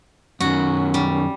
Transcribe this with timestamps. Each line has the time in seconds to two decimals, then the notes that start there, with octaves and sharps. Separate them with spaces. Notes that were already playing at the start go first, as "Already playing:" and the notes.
0.40 F#2 D#3 C#4 F#4
0.94 G3